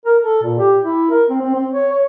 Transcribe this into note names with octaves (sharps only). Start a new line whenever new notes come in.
A#4
A4
A#2
G4
E4
A#4
C4
C4
C4
C#5
C#5